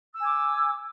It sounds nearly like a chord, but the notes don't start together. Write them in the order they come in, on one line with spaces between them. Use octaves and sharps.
E6 G#5 D6